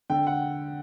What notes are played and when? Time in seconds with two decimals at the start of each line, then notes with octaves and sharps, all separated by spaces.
0.10 D3 G5
0.27 F#5